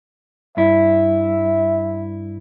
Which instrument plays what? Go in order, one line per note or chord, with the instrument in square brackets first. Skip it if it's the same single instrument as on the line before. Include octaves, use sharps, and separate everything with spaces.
[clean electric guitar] G2 E4 [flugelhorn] E5